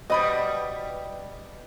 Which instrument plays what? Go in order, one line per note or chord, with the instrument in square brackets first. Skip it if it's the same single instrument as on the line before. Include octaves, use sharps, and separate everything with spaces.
[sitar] B2 G3 [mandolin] D5 B5 D#6 [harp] D#5